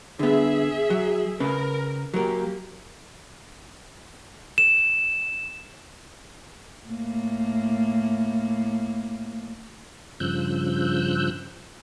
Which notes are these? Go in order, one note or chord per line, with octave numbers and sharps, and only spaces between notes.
D3 B3 G#4 E5
F#3
C#3 C#4 A#4 B4
F#3 A#3 G4 A#4
E7
A2 A#3
G2 C#3 F3 E6 F#6 G6